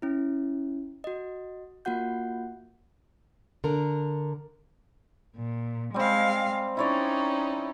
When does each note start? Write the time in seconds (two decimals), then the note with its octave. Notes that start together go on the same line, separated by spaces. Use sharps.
0.02 C#4 E4
1.04 F#4 D#5
1.85 A#3 F4 F#4 F#5 G6
3.64 D3 A#4
5.36 A#2
5.94 G3 G#3 C4 F5
6.77 C#4 D#4 E4 C#5 D5